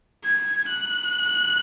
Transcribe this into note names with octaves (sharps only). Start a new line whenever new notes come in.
G#6
F#6